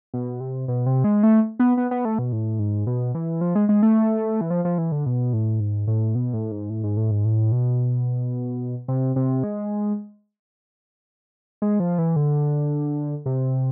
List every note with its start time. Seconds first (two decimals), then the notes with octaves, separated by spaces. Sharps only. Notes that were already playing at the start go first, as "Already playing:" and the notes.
0.14 B2
0.40 C3
0.68 B2
0.87 C3
1.04 G#3
1.23 A3
1.60 B3
1.77 B3
1.91 B3
2.05 A3
2.19 B2
2.32 A2
2.59 G#2
2.87 B2
3.15 E3
3.41 F3
3.55 G#3
3.69 G#3
3.83 A3
4.41 E3
4.51 F3
4.65 F3
4.78 E3
4.92 D3
5.06 B2
5.33 A2
5.60 G#2
5.87 A2
6.15 B2
6.34 A2
6.52 G#2
6.70 A2
6.83 G#2
6.97 A2
7.11 G#2
7.25 A2
7.52 B2
8.88 C3
9.16 C3
9.44 G#3
11.62 G#3
11.80 F3
11.98 E3
12.16 D3
13.26 C3